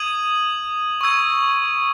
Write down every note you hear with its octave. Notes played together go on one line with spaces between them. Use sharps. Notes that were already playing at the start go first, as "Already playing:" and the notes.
Already playing: D#6 G#6 D#7 F#7
C#6 E6 G#6